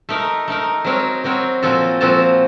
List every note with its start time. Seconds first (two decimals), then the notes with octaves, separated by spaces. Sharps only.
0.09 A3 D#4 A#4
0.48 A3 D#4 A#4
0.85 F#3 C4 F#4 A#4 C#5
1.24 F#3 C4 F#4 A#4 C#5
1.62 A#2 F3 C4 F#4 A4
2.01 A#2 F3 C4 F#4 A4